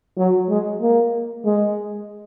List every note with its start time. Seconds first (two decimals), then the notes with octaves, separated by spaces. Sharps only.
0.17 F#3
0.49 G#3
0.81 A#3
1.45 G#3